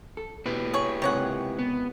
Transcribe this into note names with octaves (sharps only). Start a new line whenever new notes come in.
A4
B2 E4 G4 B4
G#4 C#5
C#2 C3 D#3 G#4 C#5 F#5
B3